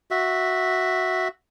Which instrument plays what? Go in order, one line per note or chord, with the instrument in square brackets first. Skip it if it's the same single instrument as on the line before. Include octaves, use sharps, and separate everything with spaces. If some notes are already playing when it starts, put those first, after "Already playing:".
[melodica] F#4 E5